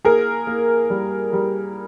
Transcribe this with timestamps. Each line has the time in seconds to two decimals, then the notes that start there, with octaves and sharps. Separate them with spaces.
0.04 A#3 G#4 A#4
0.47 A#3
0.90 G3
1.33 G3